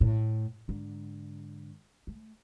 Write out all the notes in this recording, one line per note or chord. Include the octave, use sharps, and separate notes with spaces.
A2
G#2 D3
A3